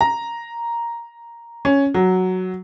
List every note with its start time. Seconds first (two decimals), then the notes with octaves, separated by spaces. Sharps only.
0.01 A#5
1.65 C#4
1.94 F#3